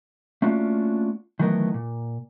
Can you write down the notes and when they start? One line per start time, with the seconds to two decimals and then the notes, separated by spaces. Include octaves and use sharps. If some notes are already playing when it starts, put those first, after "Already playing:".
0.42 A3 A#3 C#4 D4 F4 F#4
1.39 D#3 E3 F#3 A3 B3 A#4
1.74 A#2